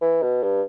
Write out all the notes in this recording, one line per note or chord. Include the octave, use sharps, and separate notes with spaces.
E3
B2
G2